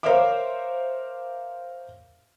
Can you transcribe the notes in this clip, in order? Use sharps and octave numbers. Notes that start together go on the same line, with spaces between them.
A#4 C5 C#5 E5 F5 D6